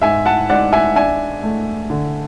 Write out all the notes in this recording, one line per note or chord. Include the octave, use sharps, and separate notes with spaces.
G#2 E5 G#5
F#5 A5
G#2 D5 F#5
E5 G#5
D4 E5 G#5
A3
D3